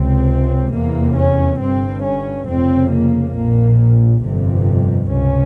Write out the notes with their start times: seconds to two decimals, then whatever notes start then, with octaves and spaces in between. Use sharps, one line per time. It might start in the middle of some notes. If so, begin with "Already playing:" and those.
Already playing: C#2 C3 C4
0.72 F1 E2 C3 A#3
1.17 C#4
1.60 G1 G2 C4
2.04 C#4
2.47 F1 F2 C#3 C4
2.92 A#3
3.35 A#1 A#2 A#3
4.23 G1 F2 C3
5.11 C#2 C3 C#4